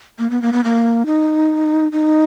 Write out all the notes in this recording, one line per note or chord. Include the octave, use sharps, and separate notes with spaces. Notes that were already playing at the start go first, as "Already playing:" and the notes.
A#3
B3
A#3
B3
A#3
D#4
D#4